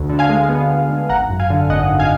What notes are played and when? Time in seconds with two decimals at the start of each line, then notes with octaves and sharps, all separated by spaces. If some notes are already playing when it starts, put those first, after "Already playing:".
Already playing: D2
0.09 D3
0.19 F5 G#5
0.29 G#3
0.49 B3
0.69 D2
0.89 D3
1.09 G#1 F#5 A#5
1.30 F#2
1.40 F5 G#5
1.50 D3
1.70 G#1 D#5 F#5
1.90 G#1
1.99 F5 G#5